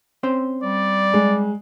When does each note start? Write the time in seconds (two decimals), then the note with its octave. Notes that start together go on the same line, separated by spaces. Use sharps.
0.23 C4 C#4 C5
0.63 G3 D5
1.14 G#3